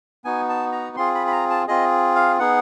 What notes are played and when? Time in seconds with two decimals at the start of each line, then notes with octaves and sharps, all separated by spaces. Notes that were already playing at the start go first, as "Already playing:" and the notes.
0.25 B3 D#4 F#4 G#5
0.49 A5
0.72 A#5
0.96 C4 F4 G#4 C6
1.15 B5
1.27 B5
1.32 A#5
1.50 A5
1.68 C4 F4 G#4 D#5
2.15 F5
2.39 B3 D#4 G#4 F#5